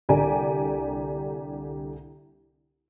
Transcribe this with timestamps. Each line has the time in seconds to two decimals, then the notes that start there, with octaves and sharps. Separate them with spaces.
0.09 C2 D3 G4 D5 G#5 A#5